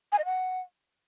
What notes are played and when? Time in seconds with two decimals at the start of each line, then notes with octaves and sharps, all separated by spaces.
0.12 G#5
0.18 D#5
0.25 F#5